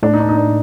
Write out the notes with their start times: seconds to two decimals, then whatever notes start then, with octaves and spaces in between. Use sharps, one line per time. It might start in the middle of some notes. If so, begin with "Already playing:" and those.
0.03 A2 D4
0.14 D#4
0.20 D4
0.29 D#4
0.37 D4